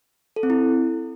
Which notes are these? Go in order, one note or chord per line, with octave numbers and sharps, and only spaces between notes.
A4
C4
E4